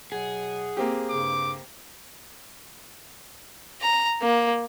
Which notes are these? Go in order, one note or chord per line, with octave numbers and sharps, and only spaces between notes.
B2 F#3 G#4 F#5
A#3 C4 G4
G2 C#3 D6
A#5
A#3